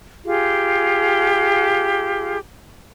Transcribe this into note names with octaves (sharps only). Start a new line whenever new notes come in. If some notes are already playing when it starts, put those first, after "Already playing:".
F4 G4 G#4